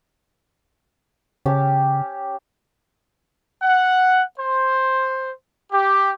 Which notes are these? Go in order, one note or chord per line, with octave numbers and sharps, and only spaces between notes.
C#3 C#4 G4 A5
F#5
C5
G4